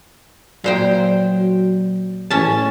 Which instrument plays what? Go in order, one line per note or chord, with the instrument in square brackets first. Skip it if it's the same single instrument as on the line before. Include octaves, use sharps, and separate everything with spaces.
[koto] A#2 C5 G5 [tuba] F#3
[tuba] A1 [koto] C#4 A5